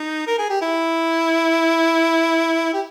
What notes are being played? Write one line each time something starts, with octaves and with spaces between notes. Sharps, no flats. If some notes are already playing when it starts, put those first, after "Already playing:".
Already playing: D#4
A#4
G#4
G4
E4
G4